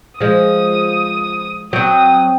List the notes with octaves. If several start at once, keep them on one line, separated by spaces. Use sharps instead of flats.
F3 G#3 D#6
F#3 C4 G5 D#6